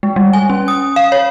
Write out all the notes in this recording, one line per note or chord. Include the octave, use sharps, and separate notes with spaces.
G#3
G3
G#5
C#4
D#6
F5
C#5